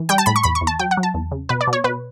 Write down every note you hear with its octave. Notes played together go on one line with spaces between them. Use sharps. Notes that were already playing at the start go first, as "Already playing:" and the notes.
Already playing: E3
G3 G5
A5
A2 B5
C#6
E2 B5
C#6
E2
A5
F#3 G5
F#5
F#3
A5
E2
C#3
B2 B4
D5
B2
C#5
B2 B4